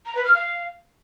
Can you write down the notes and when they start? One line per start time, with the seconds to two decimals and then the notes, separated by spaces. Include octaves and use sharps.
0.06 A#5
0.15 B4
0.25 F6
0.34 F5